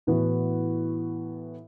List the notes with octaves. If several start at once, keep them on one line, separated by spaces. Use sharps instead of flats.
A2 E3 B3 F#4